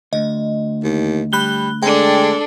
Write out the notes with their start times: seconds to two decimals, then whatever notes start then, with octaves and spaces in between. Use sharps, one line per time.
0.13 D2 D#5
0.84 D#2
1.33 G3 B5 F#6 G7
1.83 G#3 D4 A4 G5